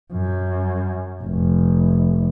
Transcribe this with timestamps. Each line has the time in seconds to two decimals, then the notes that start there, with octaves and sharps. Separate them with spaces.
0.13 F#2
1.23 F1